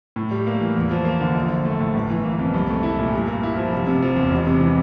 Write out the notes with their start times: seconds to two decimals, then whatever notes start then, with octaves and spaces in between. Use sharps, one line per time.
0.16 A2
0.31 G3
0.47 A#3
0.61 E3
0.76 E2
0.91 F3
1.05 A#3
1.20 D3
1.35 A#1
1.49 F3
1.65 A3
1.80 A2
1.94 G1
2.10 E3
2.25 A#3
2.39 F2
2.54 C2
2.69 A3
2.83 E4
2.99 A#2
3.12 G2
3.28 A#3
3.43 E4
3.57 F3
3.72 F1
3.87 C3
4.02 F3
4.17 E2
4.31 E1
4.47 C3
4.61 E3